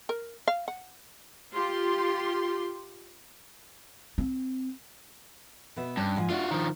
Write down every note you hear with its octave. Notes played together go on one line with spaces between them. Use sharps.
A#4
F5
F#5
F4 G4 C6
C4
B2 B3 E5
G2 C#4
G#2 F3 G#5
D4 F4 F#4 E5 F5
D#3 F3